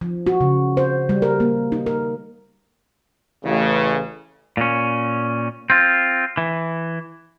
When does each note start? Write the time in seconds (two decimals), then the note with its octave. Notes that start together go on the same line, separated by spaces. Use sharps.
0.01 F3
0.27 F#4
0.41 C#3
0.77 C5
1.09 G3
1.22 A#4
1.40 A#3
1.72 D#4
1.86 A#4
3.44 A1 C#3
4.57 A#2 C#4
5.70 C4 F4
6.37 E3